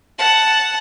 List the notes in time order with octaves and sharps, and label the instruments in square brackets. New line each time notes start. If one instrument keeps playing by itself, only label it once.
[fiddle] F#5 A5